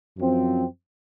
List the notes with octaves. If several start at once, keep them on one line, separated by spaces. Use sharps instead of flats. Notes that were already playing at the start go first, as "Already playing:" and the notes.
F#2 F3 C4